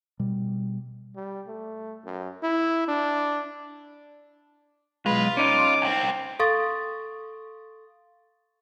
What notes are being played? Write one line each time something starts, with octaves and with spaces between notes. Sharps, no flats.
B2 G3
G3
A3
F#2
E4
D4
B1 E2 G#3 F4 B4
C#4 D#4 D6
C2 C4
A4 F5 C6 C#6 D#6 A6